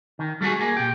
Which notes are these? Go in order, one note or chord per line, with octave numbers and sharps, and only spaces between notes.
D#3
G3 A3 C4 F#4 G#4
A#3 G#4
A#2 G4